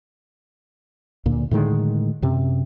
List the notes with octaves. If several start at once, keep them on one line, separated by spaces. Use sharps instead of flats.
D2 A#2
A2 D3 D#3 G#3
F#2 C3